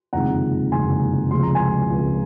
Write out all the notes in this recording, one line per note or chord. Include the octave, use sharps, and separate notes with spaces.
F#1 F2 C3 D#3 G#3 F#5 A#5
F#1 F2 C3 D#3 G#3 G#5 C6
C#2 C3 F3 G#3 C6
A#5
G#5 C6
C#2 C3 F3 G#3